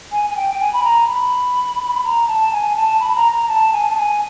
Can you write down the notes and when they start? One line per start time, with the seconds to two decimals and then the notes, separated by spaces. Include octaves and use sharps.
0.12 G#5
0.30 G#5
0.36 G5
0.51 G5
0.61 G#5
0.73 B5
0.84 A#5
1.08 B5
2.04 A#5
2.28 A5
2.52 G#5
2.76 A5
3.00 B5
3.16 A#5
3.32 A#5
3.49 A5
3.73 G#5
3.91 A5
3.96 G#5